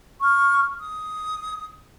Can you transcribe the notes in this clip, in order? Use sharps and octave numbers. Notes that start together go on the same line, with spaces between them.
C#6 F6
D#6